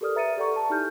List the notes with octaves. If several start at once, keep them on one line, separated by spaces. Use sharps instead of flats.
G4 A4 A#4 D5 D#6 F6
B4 E5 A#5 A6 C#7 D#7
G4 A4 D5 F#5 A#5 C#6
A5
D#4 E4 G4 G#5 F6 G6